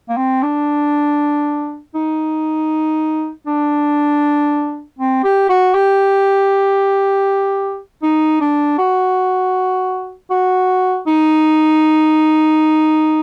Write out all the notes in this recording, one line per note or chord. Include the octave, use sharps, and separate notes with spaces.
A#3
C4
D4
D#4
D4
C4
G4
F#4
G4
D#4
D4
F#4
F#4
D#4